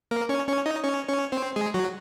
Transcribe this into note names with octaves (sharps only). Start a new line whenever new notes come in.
A#3 A#4
C#4 C#5
C#4 C#5
D#4 D#5
C#4 C#5
C#4 C#5
C4 C5
G#3 G#4
F#3 F#4